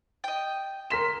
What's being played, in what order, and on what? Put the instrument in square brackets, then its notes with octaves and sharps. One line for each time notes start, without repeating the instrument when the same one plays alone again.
[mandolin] D#5 G5
[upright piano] A#4 B6 E7 [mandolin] C6